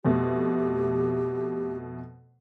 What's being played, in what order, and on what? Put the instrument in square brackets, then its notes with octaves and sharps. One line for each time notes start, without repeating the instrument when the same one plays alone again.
[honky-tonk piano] F2 B2 A3 [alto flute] G4